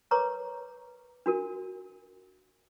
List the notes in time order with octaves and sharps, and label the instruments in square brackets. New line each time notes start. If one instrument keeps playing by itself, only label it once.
[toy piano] A#4 B4 C#5 A#5 C#6 D6
D4 F#4 A#4